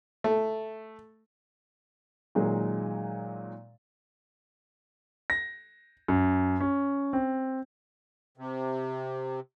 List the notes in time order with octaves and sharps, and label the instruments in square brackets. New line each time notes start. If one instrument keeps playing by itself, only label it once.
[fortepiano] A3
[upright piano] A#2 D#3 F#3 G#3
[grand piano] A#6
F#2
C#4
C4
[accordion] C3